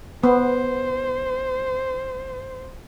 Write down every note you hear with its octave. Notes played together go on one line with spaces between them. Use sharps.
B3 C5